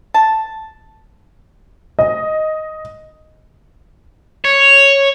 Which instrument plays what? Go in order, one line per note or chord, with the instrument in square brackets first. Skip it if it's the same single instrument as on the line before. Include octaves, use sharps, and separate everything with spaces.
[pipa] A5
[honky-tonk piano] D#5
[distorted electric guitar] C#5